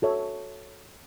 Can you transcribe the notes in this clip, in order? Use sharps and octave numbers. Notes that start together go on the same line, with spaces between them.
F#4 A4 C#5 E5